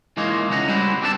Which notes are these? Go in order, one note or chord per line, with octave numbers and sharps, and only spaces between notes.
E3 G#3 A#3 D#4 F4 C#5
C#2 C#4 F#5 A#5
G3 C#4 E4 F#4 B4 C5
C4 D4 A4 B4 D5 A5